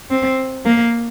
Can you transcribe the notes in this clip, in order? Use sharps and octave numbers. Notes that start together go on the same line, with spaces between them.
C4
A#3